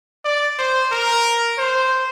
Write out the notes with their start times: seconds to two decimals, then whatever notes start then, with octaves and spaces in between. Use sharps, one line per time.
0.25 D5
0.59 C5
0.92 A#4
1.58 C5